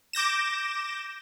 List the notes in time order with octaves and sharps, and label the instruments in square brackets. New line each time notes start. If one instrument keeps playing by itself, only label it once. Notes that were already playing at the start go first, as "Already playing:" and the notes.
[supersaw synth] D6 G6 A#6 E7